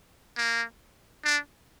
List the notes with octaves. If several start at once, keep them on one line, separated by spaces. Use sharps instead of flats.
A#3
D4